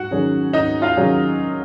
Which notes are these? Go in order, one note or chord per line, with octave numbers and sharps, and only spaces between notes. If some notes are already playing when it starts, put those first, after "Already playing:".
Already playing: G#2 F#4 F#5
D#3 F#3 C#4 G#4
G#2 D#4 D#5
F4 F5
D#3 F#3 C#4 G#4